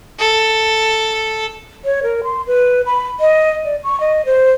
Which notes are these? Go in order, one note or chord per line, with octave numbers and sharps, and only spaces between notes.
A4
C#5
A#4
C6
B4
B5
D#5
D5
C#6
D#5
C5